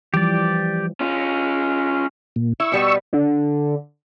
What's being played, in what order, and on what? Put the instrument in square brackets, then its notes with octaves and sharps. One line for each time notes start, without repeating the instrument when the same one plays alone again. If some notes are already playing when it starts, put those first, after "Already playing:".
[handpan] E3 F3 G3 [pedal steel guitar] G4 D5
[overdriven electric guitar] C#4 F4
[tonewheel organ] A#2
[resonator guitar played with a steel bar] E4 [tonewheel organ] C#6 E6
[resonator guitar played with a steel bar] B2 G3 B3
[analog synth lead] D3